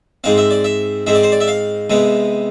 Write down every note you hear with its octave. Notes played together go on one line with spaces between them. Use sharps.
G#2 G#3 C4 F5
E5
D5
E5
G#2 G#3 C4 E5
D5
C5
D5
E5
F5
C3 G#3 B3